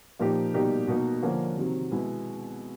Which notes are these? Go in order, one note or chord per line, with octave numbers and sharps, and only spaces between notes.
A#2 F3 A#3 D#4 G4
B2 G3 A#3 D#4 G4
B2 F#3 A#3 D#4 F#4
D3 F3 A#3 C#4
C3 D#3 F#3
B2 G#3 B3 E4